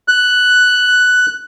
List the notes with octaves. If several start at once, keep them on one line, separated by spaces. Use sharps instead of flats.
F#6